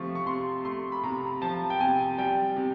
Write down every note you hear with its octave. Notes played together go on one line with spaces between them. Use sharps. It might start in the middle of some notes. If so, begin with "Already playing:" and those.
Already playing: C3 F3 A3 C#6
C#6
C3 C6
A3 C6
B5
C3 A#5
F3 A5
G5
C3 G#5
G3 G5
C3